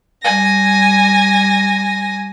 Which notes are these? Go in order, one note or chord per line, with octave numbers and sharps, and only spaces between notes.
G3 G#5 A#6